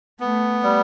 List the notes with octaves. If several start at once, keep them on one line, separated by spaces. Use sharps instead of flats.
A3 B3
G3